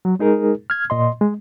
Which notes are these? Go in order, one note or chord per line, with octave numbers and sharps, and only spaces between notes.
F#3
G#3 D#4 G#4 A#4
F6 G#6
A#2 D#5 C6
G#3